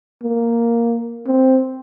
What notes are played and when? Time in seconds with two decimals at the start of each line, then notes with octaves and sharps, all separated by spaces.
0.23 A#3
1.27 C4